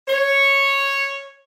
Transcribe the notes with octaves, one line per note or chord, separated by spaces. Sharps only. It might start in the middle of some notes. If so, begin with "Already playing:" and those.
C#5